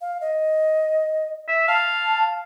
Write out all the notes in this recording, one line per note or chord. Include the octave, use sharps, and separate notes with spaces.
F5
D#5
E5
F5 A5